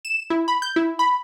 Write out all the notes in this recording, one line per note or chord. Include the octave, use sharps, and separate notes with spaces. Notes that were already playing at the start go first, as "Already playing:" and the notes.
E7
E4
B5
G6
E4
B5